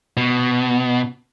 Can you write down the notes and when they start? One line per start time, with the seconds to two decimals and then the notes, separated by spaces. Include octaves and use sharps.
0.17 B2